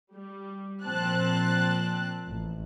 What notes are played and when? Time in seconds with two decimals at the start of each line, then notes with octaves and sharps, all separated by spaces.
0.12 G3
0.84 A#2 F3 C4 A5 F#6
2.27 A1